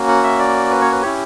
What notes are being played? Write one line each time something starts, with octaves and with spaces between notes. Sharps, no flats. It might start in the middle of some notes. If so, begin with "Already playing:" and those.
Already playing: A#3 C#4 F#4
F#5
E5
D5
B4
C#5
B4
C#4 E4 G4 C#5